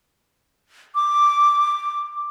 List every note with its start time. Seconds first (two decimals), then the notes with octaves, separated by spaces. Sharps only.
0.95 D6